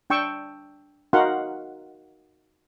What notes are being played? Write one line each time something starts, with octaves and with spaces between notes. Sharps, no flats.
D4 G5 C#6 E6
D#4 F#4 A#4 F5 F#5 C6